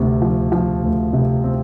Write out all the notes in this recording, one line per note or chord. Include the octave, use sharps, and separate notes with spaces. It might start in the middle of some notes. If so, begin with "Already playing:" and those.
Already playing: D2 C3
F3
F3
D2
C3
C4